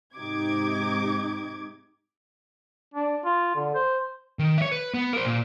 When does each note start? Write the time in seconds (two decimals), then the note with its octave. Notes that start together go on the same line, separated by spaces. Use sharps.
0.15 G#2 C3 D#4 G4 D6 G#6
2.94 D4
3.24 F4
3.55 D3
3.75 C5
4.39 D#3
4.58 C#5 E5
4.72 B4
4.94 B3
5.13 A#4 C5
5.25 A#2